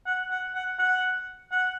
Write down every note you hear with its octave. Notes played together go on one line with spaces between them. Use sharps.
F#5
F#5
F#5
F#5
F#5